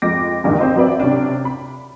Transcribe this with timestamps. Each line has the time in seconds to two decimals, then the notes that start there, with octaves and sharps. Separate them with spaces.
0.02 F2 G#3 D6 A#6
0.44 A1 E2 G2 D3 D#3
0.59 C4 C5 D#5
0.76 F#3 C4 B4 D5 E5
1.00 C3 C#4 D4
1.45 B5